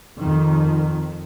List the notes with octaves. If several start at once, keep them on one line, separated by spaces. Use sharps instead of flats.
F2 D#3